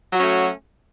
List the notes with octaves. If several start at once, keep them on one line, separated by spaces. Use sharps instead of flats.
F#3 A3 C#4 F#4